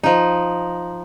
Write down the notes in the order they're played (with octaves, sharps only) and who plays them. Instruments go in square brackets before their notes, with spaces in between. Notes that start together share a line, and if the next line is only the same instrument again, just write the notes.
[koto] F3 D#4